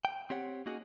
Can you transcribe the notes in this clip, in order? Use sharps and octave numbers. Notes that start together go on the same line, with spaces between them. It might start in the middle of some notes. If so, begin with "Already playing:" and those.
G5
C4 G4 C#5 F#5
A#3 C#4 D#4 F#4 G#4